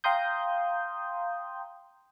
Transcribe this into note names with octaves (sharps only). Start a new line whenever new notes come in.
F5 G5 A#5 C6 D#6 G6